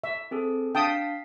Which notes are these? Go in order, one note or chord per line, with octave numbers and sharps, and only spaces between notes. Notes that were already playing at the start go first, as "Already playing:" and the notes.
E5
C4 G#4 A4
D4 F5 G5 A5 D#6 B6